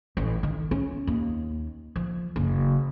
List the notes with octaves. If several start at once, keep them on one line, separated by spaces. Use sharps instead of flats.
A1
D#3
C#4
D#2
F3
F#1